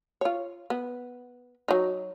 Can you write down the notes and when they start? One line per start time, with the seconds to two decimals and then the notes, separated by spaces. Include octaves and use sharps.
0.21 F4 C#5
0.70 B3
1.68 F#3 D#4